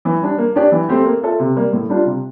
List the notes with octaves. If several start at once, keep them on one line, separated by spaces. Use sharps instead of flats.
E3
G3 D4
A#3
D4 G4 D5
E3
A3 C4 G4
A#3
F4 A4 E5
C3
G3 A#3
A2
G3 D4 F4
C3